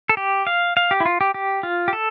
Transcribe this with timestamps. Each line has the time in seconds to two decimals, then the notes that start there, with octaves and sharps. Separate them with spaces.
0.09 A4
0.17 G4
0.47 F5
0.77 F5
0.91 G4
1.00 E4
1.05 F4
1.21 G4
1.34 G4
1.63 F4
1.88 G4
1.93 A4